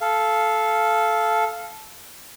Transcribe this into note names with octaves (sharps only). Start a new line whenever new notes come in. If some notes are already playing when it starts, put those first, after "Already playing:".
A4 F5